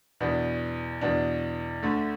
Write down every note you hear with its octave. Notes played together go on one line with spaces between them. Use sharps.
E2 B2 B3 D4
E2 B2 B3 D4
D2 D3 A3